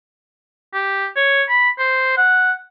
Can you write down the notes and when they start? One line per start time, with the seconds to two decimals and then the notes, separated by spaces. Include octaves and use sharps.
0.74 G4
1.16 C#5
1.49 B5
1.79 C5
2.17 F#5